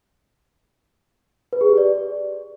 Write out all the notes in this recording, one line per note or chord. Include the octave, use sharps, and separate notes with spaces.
B4
G#4
G4
D5